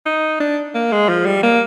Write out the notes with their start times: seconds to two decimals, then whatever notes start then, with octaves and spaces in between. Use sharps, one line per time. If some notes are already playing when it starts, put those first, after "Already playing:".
0.06 D#4
0.40 D4
0.75 A#3
0.92 G#3
1.09 F3
1.26 G3
1.43 A#3